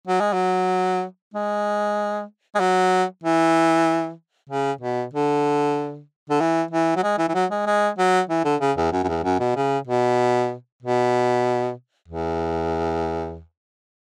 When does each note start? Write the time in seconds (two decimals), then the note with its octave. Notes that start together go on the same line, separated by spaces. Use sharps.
0.08 F#3
0.21 G#3
0.33 F#3
1.34 G#3
2.55 G#3
2.60 F#3
3.24 E3
4.50 C#3
4.81 B2
5.14 D3
6.30 D3
6.40 E3
6.71 E3
6.96 F#3
7.03 G#3
7.18 E3
7.29 E3
7.34 F#3
7.51 G#3
7.67 G#3
7.98 F#3
8.30 E3
8.45 D3
8.61 C#3
8.77 E2
8.92 F#2
9.04 F#2
9.08 E2
9.24 F#2
9.40 B2
9.56 C#3
9.87 B2
10.83 B2
12.08 E2